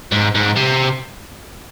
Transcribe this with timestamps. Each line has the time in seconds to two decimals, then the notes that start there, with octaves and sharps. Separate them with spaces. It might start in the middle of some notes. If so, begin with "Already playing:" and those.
0.12 G#2
0.35 G#2
0.57 C3